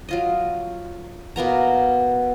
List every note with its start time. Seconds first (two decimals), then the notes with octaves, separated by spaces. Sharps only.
0.09 F#3 F4 D#5
1.36 B2 A#3 B3 A#5